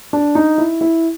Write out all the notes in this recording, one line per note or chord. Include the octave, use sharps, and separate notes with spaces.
D4
D#4
E4
E4